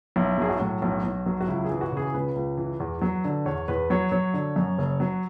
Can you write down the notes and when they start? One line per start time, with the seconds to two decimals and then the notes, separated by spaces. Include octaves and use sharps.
0.16 B1 E4
0.38 F#3 G#4
0.49 F#4
0.59 A2
0.82 B1
1.03 B1
1.26 F#3
1.41 F#4
1.48 C#2 E4
1.64 G#4
1.70 E3
1.81 F#4
1.92 C#3 G#4
2.14 C#2 B4
2.36 C#2
2.57 E3
2.80 E2
3.01 F#3
3.24 D3
3.46 E2 C#5
3.68 E2 B4
3.90 F#3 C#5
4.12 F#3 C#5
4.34 D3
4.56 F#2
4.78 F#1
5.00 F#3